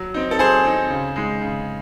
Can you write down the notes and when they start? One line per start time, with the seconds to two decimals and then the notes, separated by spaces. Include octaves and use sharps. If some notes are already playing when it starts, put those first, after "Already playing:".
Already playing: F#3
0.14 C4 D#4
0.31 A4
0.39 F#3 G#4 C5
0.65 C4 D#4
0.90 C#3
1.16 G#3 D#4
1.41 C#3